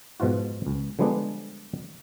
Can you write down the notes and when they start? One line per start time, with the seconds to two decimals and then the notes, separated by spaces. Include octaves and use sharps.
0.20 G#2 B2 F3 F4 F#4
0.66 C#2
0.99 D3 F3 G3 G#3 B3 D4